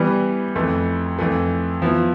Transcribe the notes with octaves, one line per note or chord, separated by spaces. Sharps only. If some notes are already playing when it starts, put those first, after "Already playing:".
Already playing: E3 G3 B3
F2 E3 A3
F2 E3 A3
F3 B3 E4